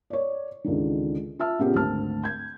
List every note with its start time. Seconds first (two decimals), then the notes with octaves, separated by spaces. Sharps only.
0.10 C#5 D5
0.64 C#2 D3 D#3
1.39 F4 E5 A5 E6 F6
1.59 A#2 C#3 B3 F4 G4
1.75 G#1 D2 C5 A5 F6
2.24 G6 G#6